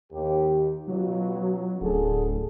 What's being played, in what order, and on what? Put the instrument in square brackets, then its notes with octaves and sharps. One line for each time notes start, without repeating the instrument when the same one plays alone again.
[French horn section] D#2 G4
[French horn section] B2 C#4 F4 [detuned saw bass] F#3
[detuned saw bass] D1 [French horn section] D3 G#4 A4